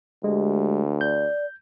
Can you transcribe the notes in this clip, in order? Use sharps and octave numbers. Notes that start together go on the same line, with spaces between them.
D2 G#3 G4
D5 G6